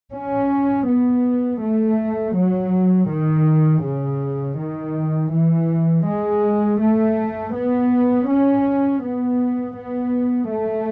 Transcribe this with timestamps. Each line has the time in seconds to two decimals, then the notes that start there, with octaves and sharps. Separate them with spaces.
0.12 C#4
0.86 B3
1.60 A3
2.35 F#3
3.09 D#3
3.83 C#3
4.58 D#3
5.32 E3
6.06 G#3
6.80 A3
7.55 B3
8.28 C#4
9.03 B3
9.77 B3
10.51 A3